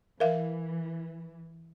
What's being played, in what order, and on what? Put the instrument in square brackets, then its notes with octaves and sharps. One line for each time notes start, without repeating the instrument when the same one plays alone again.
[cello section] E3 [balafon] A#4 E5 F5